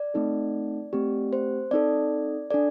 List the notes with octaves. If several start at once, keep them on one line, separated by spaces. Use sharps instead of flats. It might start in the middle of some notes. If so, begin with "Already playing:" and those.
Already playing: D5
A3 C4 D#4 A4
A3 C4 G4
C5
C4 D#4 A4 D5
D4 A4 D5